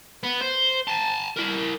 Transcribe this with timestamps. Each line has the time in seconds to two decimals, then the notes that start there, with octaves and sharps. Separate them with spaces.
0.23 B3
0.41 C5
0.88 G#5 A5
1.37 E4 A#4